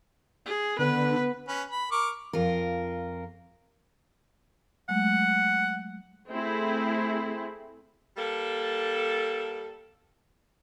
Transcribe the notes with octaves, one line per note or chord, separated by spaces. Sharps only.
G#4
D3 B3 B4
C#4 B4
B5
A#4 C#6 D6
F2 F4 A#4
F#3 G#3 A3 F#5
A3 C4 E4 G#4
G3 A#3 A4